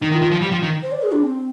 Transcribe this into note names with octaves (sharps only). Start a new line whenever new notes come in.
D#3 D#4
D#3
F4
D#3
F3
G3
F3
D#3
C5
D5
G#4
D4
C4